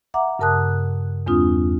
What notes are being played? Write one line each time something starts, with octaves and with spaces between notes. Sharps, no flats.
E5 F#5 A#5 D6
G2 C#3 A#4 A5 D#6 F#6
E2 G#3 C4 D4 F4 D#6